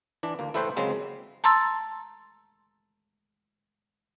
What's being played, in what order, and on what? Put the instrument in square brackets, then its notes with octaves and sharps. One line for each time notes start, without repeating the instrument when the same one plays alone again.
[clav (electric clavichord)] E3 D4
D2 A#3
A3 E4 A4 B4 C5 G5
C#3 F#3 G#3 A#3 C4
[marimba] A5 A#5 C6 E6 A6